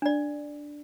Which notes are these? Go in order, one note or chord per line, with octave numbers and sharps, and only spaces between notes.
D4 D5